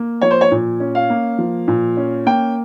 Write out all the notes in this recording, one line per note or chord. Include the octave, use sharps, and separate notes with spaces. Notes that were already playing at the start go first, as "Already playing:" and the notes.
Already playing: A#3
F3 C#5
C5
C#5
A#2
C#4
F5
A#3
F3
A#2
C#4
A#3 G5